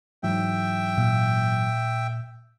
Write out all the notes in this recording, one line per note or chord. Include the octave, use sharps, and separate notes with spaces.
G#2 E3 F#3 E5 G5
A#2